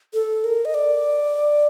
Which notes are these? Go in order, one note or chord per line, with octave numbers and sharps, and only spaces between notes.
A4
A#4
D#5
D5